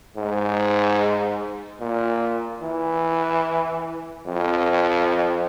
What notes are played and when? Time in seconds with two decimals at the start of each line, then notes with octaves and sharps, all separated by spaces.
0.17 G#2
1.81 A#2
2.63 E3
4.27 F2